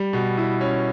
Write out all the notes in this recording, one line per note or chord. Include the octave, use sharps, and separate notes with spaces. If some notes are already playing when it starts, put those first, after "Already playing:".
Already playing: G3
B2
E4
C#4